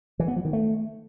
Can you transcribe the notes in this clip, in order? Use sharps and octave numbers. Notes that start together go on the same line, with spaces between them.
E3
B3
F3
D#3
A3